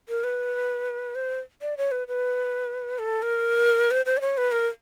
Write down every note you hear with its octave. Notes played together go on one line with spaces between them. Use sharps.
A#4
B4
C5
D5
C#5
B4
B4
A4
A#4
C5
C5
D5
C#5
B4
A#4